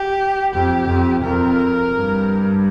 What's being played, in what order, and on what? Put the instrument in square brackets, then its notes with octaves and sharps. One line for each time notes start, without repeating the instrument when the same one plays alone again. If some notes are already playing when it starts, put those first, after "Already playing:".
Already playing: [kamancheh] G4
[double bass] F2 [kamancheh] G4
[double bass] F2
[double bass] F2 [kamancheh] A#4
[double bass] G2